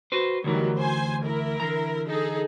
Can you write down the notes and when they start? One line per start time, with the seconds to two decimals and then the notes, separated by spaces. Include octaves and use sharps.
0.12 F#4 B4 C5
0.44 D2 D#3 E3 F#3 G3
0.78 C5 G#5
1.25 E4 A#4
1.60 D3 E3 A#5
2.08 D#4 G#4 A4